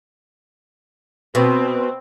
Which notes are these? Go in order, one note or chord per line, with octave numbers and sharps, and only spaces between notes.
B2 C4